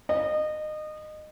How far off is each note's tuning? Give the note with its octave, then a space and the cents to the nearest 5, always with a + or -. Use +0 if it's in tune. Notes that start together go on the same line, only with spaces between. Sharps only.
D#5 -25